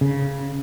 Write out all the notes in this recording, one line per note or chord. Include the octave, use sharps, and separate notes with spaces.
C#3